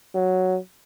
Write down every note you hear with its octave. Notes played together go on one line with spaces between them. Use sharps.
F#3